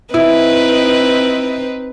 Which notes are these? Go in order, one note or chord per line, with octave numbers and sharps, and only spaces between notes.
C4 D#4 E4 B4